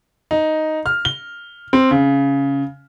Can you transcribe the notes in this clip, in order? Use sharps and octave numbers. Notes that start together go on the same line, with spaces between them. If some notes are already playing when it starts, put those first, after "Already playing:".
D#4
F6
G7
C4
C#3